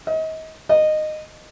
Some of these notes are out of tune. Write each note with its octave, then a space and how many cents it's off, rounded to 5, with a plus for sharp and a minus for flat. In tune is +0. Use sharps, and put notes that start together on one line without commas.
D#5 +35
D#5 -15